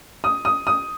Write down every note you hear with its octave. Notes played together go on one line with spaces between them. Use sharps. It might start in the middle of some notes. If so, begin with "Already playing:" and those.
D#6
D#6
D#6